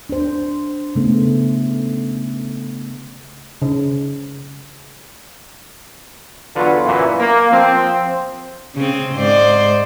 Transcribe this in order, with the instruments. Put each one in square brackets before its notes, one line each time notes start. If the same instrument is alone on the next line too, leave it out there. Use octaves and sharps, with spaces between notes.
[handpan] D4 C5
C#3 A3 B3
[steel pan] C#3
[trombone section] E2 D3 F#3 F4 B4
F#2 A#2 E3
A#3
F3 C4
[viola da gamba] C#3 C4
G#2 C5 D5